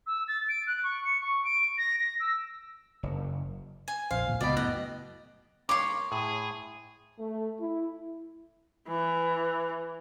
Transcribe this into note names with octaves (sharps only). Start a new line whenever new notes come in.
E6
A6
D7
F#6
C#6
C#7
C#6
D7
A#6
A#6
E6
F#1
G#5
A#1 F2 C5 F5
A1 D2 A#2
C#2 B2 D5 D#5 G5 B5
F#2 A2 D#5 F#6
A#3 C#5 C6 D6
A2 G#4
A3
E4
E3